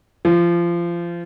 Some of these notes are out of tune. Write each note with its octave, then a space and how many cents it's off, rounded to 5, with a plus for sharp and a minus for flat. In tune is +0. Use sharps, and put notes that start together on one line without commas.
F3 -25